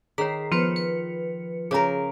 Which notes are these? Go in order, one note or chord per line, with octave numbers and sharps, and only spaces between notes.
D#3 G#4 C#5 A#5 B6 C7
F3 B3 F4 B4 C5 C#7
B4
C#3 G#4 A#4 C#5 A#5